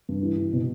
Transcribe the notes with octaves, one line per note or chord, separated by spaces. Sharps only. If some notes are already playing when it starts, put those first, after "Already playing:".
G2
E3
E3
B2